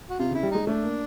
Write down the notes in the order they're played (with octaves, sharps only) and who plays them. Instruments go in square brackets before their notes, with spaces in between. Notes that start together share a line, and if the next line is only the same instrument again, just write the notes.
[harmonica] F#4
[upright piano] C3 [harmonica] F4
[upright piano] C#3 [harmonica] E4
[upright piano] G3
[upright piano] G#3 [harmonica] D#4
[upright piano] A3 [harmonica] D4
[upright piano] A#3